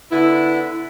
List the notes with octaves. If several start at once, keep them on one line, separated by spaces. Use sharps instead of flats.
D3 B3 E4